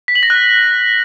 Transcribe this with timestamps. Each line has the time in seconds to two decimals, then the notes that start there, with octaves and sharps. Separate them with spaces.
0.08 B6
0.15 F#7
0.23 A#6
0.30 F#6